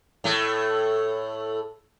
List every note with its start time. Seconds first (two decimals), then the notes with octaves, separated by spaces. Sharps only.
0.24 A2 A3